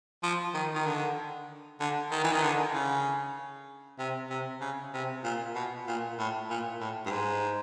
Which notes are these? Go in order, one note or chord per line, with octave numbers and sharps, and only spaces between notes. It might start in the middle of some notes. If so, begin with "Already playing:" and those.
F3
D#3
D#3
D3
D3
D#3
E3
D#3
D3
C#3
C3
C3
C#3
C3
A#2
B2
A#2
A2
A#2
A2
G2
G#2